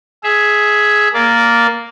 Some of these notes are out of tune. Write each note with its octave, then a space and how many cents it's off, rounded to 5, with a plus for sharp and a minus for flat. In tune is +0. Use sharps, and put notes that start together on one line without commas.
G#4 +10 E5 +0
A#3 +0 D5 -10